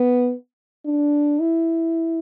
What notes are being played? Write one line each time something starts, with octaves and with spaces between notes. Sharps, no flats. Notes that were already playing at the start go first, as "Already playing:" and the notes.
Already playing: B3
D4
E4